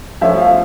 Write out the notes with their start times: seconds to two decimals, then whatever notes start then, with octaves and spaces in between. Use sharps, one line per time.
0.21 F3 A3 C#4 E5
0.39 F5